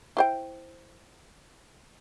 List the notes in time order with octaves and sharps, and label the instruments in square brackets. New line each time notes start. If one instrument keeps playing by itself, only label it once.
[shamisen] E4 C5 G5